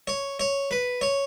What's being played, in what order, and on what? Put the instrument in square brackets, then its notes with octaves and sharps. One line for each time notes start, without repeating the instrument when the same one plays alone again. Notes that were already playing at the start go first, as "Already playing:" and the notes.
[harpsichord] C#5
C#5
B4
C#5